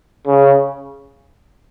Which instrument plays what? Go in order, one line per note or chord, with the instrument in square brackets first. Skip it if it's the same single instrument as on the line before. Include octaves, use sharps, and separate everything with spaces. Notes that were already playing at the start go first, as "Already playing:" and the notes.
[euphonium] C#3